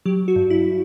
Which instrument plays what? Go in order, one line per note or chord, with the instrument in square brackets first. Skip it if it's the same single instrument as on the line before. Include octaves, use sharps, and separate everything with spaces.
[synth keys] F#3 G4
F#4
G2
E4